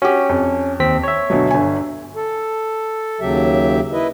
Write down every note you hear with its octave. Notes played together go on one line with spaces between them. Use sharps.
C#4 F#4 G4
F2
D#2 C4 B6
C#5 E5
D2 B2 F#3
G1 G#5
A4
D#2 C#3 F#3 G4 E5
E4 B4 D#5